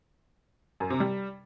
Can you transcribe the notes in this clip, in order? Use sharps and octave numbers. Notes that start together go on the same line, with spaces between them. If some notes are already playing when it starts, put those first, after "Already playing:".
F#2
C3
G3